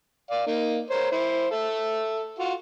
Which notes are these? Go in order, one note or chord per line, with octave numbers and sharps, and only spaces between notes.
D5 F5
A#3 D#4
A#4 C5 C#5
E4 C5
A4 E5
F4 F#4